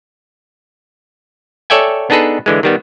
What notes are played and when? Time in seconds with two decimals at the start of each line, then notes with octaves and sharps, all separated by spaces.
1.70 A4 C#5 D5 E5 G5 G#5
2.10 B3 D4 D#4 G#4 A4 B4
2.46 D3 E3 G#3
2.63 D#3 G3 B3